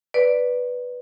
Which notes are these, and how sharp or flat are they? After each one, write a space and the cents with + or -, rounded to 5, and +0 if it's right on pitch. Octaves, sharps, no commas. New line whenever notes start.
B4 +0 D5 +0